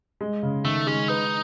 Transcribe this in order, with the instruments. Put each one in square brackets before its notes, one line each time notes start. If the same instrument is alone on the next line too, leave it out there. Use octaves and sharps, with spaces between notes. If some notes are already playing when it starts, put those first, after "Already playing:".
[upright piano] G#3
C#3
[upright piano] D#3 [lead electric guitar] A3
[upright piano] G#3 [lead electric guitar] C#4
[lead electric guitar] D#4 [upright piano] B4